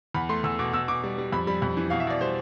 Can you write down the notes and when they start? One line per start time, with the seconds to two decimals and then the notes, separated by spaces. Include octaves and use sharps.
0.14 E2 B5
0.29 A3 C6
0.44 E2 E6
0.59 B2 D6
0.73 B2 E6
0.88 B2 D6
1.04 G3
1.18 G3
1.32 F2 B5
1.47 G3 B5
1.62 F2 B5
1.77 E3
1.90 B2 F5
2.00 E5
2.07 B2 D5
2.21 G3 C5